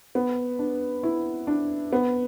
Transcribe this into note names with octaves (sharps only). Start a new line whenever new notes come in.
B3
D4
E4
D4
B3